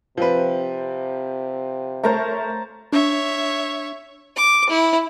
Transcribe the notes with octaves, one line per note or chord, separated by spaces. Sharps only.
C3 F3 C4 B4
A3 A#4 C5 C#5 A5 A#5
D4 C#5 E5
D6
E4